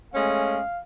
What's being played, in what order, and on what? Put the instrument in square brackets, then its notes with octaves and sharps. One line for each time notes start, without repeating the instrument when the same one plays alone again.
[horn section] G#3 A3 C#4 [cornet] F5